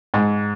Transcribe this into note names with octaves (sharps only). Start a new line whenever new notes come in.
G#2